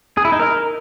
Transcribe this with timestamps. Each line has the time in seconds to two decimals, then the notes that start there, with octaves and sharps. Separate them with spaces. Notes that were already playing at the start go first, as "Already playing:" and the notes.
0.17 G#4
0.25 E4
0.32 D#4
0.40 A#4